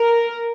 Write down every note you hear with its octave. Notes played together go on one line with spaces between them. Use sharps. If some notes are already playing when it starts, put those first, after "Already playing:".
Already playing: A#4